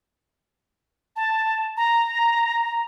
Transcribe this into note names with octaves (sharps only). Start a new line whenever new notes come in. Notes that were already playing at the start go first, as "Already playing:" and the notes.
A5
A#5